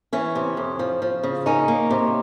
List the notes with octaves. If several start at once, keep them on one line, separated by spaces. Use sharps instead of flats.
E3 C#4
C3
F2
F3
F3
C#3
A#3 C#4 D#4
A#3
C3